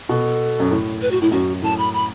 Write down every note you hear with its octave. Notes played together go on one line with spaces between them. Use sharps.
B2 A4
F#2
A2
B4
F#4
A2 E4
F#2 F#4
A2 A5
B5
B5